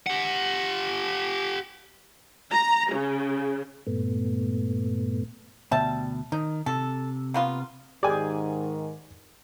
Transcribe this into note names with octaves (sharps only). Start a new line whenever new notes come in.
G4 F#5
A#5
C#3
G2 A#2 A3 B3
D2 B2 G3 E5 A5
D#3 D#4
C3 A4
A#3 B3 F4
G#2 D#3 G4 G#4 D5 G#5